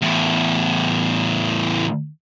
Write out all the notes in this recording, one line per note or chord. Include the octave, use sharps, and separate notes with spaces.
E2 A2